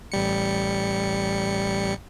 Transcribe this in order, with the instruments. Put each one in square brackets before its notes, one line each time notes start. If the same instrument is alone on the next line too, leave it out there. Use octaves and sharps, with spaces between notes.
[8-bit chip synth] A1 G3 C#7